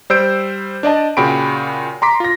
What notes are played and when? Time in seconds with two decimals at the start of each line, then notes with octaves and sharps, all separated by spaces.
0.10 G3 C5 E6 G6 D7
0.83 D4 D5 D#5 A5
1.17 A#2 C#3 F#4 G5 B5 D7
2.02 A#5 C6 D6 B6
2.20 F4 A#6